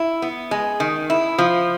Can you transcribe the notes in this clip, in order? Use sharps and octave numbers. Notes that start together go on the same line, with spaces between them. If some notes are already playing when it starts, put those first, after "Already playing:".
Already playing: E4
B3
G#3
D#3
E4
F3